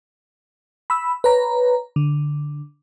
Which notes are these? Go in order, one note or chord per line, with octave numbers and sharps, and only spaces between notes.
B5 E6
B4 C#5 A#5
D3